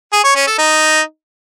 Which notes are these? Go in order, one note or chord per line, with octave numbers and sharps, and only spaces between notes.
G#4
C#5
C#4
A4
D#4